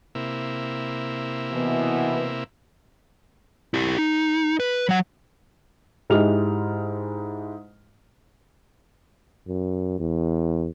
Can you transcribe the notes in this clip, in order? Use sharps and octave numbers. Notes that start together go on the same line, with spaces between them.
C3 A#3 E4
B2 E3 B3
E4 G4
D#4
B4
F#3 F#5
G#2 G#3 E4 G4 F6 F7
F#2
E2